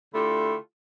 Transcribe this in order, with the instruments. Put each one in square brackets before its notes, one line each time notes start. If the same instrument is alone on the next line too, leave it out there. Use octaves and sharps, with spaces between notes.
[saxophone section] D3 A3 E4 F4 G4 A4